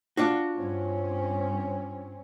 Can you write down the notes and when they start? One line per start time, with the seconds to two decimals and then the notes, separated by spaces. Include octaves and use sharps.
0.17 D4 F4 F#4
0.55 G2 C4 C#4